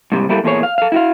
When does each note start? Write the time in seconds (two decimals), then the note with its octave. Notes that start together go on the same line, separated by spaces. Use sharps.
0.12 G#2 C3 G3
0.29 G3 A3 A#3 E4 G4 A4
0.44 E2 A#2 A3 A#3 G#4 C#5
0.63 F5
0.78 A4 F5
0.92 E4 F#4 F5